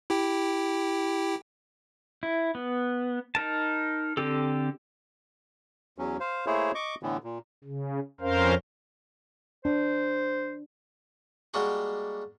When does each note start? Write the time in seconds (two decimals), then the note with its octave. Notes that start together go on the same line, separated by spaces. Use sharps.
0.10 E4 G4 G5
2.23 E4
2.55 B3
3.35 D#4 A#4 A5
4.17 D3 C4 G4 A4
5.98 E2 F#3 C#4
6.20 C5 F5
6.47 A3 A#3 E4 G#4 C5 C#5
6.75 D#5 C#6 D6
7.03 A2 D3 E3 B3
7.24 A#2
7.64 C#3
8.21 F2 C#4 A#4 C5 F5
9.65 D4 C5
11.54 G3 G#3 A#3 D4 F#4 F#5